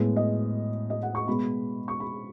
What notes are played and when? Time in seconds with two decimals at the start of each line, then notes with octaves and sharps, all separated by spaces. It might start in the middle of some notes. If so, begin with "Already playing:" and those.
Already playing: A2 G#3 B3
0.16 D#5
0.90 D#5
1.03 F#5
1.15 C#6
1.27 B2 G#3 B3 B5
1.88 C#6
2.00 B5